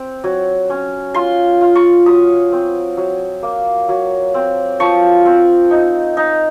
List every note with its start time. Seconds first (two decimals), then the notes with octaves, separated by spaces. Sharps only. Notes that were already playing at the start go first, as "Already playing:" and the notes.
Already playing: C4
0.24 F#3
0.70 C#4
1.14 F4 C6
1.61 F4
1.75 C#6
2.06 F#3 D#6
2.52 C4
2.97 F#3
3.43 A#3
3.89 F#3
4.34 C4
4.80 F3 C#6
5.26 C4
5.71 D#4
6.17 D#4